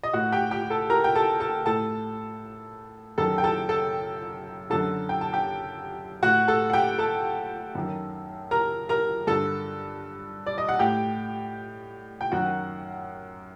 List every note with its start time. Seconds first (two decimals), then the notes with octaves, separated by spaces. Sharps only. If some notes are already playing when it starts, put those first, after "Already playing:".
0.03 D#5
0.13 A2 F#4 F#5
0.32 G4 G5
0.51 G4 G5
0.70 A4 A5
0.90 A#4 A#5
1.04 G5
1.15 A4 A5
1.40 A4 A5
1.65 A2 A4 A5
3.18 F#2 D#3 A4 A5
3.38 G5
3.44 A4 A5
3.69 A4 A5
4.70 F#2 D3 A4 A5
5.09 G5
5.21 A5
5.33 G4 G5
6.23 A2 F#4 F#5
6.48 A4 A5
6.70 F#5
6.73 G4 G5
6.98 A4 A5
7.75 F#2 D#3
8.51 A#4 A#5
8.89 A#4 A#5
9.27 G2 D3 A4 A5
10.46 D5
10.58 D#5
10.69 F#5
10.79 A2 G4 G5
12.21 G5
12.32 F#2 D#3 F#4 F#5